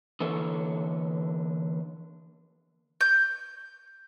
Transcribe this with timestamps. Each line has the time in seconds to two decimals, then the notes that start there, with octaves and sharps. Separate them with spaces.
0.20 D3 E3 A#3 A4 C#5
3.01 G6